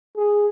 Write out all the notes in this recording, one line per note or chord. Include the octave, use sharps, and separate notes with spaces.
G#4